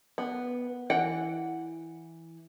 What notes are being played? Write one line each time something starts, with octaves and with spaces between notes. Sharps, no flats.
B3
E3 F#5 G5